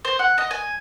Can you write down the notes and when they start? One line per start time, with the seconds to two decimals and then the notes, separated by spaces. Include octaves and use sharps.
0.05 C5
0.19 F#5
0.38 D#5
0.51 G#5